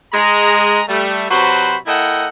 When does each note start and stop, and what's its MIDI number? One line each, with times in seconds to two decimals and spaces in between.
0.13 0.81 56
0.13 0.81 82
0.88 1.26 55
0.88 1.26 57
1.30 1.76 48
1.30 1.76 54
1.30 1.76 66
1.30 1.76 71
1.30 1.76 72
1.30 1.76 83
1.87 2.27 58
1.87 2.27 64
1.87 2.27 69
1.87 2.27 75
1.87 2.27 78
1.87 2.27 79